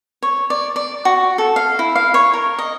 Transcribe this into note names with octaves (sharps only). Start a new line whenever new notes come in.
C#5
D5
D5
F#4
A4
F5
E4
F5
C#5
A#4
D#5